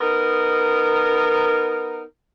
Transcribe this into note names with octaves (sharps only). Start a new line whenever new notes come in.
B3 D#4 A#4